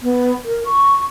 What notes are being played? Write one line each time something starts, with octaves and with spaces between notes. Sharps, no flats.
B3
A#4
C#6